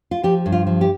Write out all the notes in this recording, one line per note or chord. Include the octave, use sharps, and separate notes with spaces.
F4
F3 G4
G2
F4
F3
G4